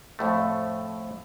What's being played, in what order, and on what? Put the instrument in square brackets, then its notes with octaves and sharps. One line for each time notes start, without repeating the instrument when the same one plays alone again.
[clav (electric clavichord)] F2 A2 A3